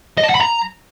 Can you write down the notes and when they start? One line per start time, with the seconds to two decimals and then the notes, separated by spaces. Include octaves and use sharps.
0.18 D#5
0.24 A5
0.29 F#5
0.35 B5
0.41 A#5